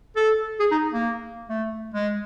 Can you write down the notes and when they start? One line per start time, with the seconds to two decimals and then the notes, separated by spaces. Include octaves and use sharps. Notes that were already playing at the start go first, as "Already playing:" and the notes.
0.16 A4
0.60 G#4
0.71 D#4
0.93 A#3
1.49 A3
1.94 G#3